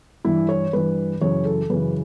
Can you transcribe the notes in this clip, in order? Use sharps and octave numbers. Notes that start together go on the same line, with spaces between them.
G2 E3 E4
C#5
G2 E3 B4
F#2 C#3 E3 C#5
A4
F#2 C#3 E3 B4